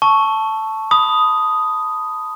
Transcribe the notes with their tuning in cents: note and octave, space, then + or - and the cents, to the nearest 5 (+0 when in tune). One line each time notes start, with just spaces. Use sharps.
A5 +0 C#6 +0 E6 +0
B5 +5 D#6 +0